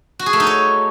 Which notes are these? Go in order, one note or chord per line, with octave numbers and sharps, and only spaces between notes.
F#4
G#4
A3
D#4
C#5